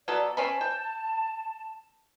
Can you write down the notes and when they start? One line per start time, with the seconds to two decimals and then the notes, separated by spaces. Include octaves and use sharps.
0.08 F#3 B3 A4 D5
0.37 C4 C#4 A5 B5
0.61 G5